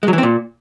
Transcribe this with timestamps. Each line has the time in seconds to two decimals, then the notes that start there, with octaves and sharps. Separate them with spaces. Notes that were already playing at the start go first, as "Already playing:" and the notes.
0.03 G#3
0.08 F#3
0.13 E3
0.18 C4
0.23 A#2